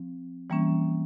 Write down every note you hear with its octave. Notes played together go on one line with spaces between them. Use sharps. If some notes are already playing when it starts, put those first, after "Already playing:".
Already playing: F3 C4
E3 G3 A#3 C#4